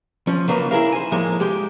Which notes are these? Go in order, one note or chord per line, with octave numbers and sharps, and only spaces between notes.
F3 C#4
C#3 F#3 A#3 B4 D#5
E4 G#4 A#4 F5
C5 G#5
A2 F3 G#3 A#3
G#3 G4